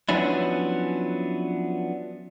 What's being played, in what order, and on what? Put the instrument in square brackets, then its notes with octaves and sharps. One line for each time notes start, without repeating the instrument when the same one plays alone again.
[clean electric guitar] F3 F#3 B3 C#4 D4 E4